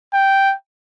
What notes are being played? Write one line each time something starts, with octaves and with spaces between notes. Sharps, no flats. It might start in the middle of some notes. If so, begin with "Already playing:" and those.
G5